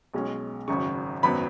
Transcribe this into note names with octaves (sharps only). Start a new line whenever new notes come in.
B1 B2 G#3 C#4
G#1 F#2 C#3 C#6
G#1 F#2 F#3 B3 B5